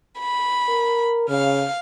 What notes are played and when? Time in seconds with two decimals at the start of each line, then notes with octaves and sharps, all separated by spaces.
0.19 B5
0.69 A#4
1.29 C#3 F5 F6